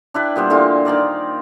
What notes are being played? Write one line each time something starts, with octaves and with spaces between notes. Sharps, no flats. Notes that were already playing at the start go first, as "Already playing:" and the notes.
D4 E4 B4 G5
A#2 G3 B3 C5
A#2 D3 E3 F4
D#3 A#3 D5 D#5